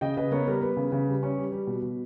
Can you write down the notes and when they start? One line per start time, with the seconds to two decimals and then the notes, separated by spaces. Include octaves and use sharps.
0.01 C#3 D#5 G5
0.17 C#3 B4 D#5
0.31 B3 A#4 C#5
0.47 G3 A#4
0.61 B3 B4
0.77 C#3
0.92 C#3
1.08 G3
1.23 C#4
1.38 G3
1.52 G3
1.67 B2
1.82 B2